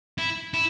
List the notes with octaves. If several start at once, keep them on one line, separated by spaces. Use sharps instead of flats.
E4
E4